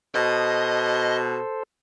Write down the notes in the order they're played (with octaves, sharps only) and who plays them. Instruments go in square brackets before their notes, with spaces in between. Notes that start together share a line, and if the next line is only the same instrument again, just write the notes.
[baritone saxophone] B2 [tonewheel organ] A4 C5 [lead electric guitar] D#5